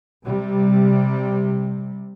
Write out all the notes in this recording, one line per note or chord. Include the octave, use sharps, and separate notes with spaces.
C3 G3